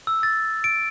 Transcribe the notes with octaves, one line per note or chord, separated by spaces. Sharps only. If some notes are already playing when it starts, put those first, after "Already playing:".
E6
A6
D7